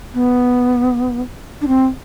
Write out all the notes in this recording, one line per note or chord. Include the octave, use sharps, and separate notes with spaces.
B3
D4
C4